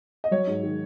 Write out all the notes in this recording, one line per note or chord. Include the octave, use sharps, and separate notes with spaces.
D#5
F#3 C#5
G#2
D#3